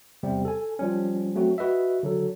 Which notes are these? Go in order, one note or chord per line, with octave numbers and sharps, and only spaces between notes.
E2 C3 G3 B3 C4
A4 G#5
F3 G3 C#4
F#3 A3 C4 F#4
F#4 B4 D#5 E5
D3 F#3 A4